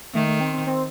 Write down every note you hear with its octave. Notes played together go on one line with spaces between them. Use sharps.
D#3 A3
A3
C4
C4
C4